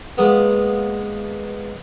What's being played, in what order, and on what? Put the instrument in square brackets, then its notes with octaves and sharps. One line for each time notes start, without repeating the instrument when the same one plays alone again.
[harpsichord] G#3 A#3 B3